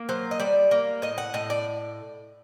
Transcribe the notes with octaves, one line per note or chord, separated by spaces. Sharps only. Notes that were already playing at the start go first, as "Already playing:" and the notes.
Already playing: A#3
F#3 C5
D#5
G3 D5
A#3
A2 D#5
F#5
A2 D#5
D5